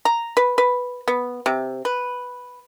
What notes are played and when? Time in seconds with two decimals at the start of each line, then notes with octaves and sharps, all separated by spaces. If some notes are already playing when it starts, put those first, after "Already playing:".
0.05 A#5
0.37 B4
0.58 B4
1.08 B3
1.46 C3
1.85 B4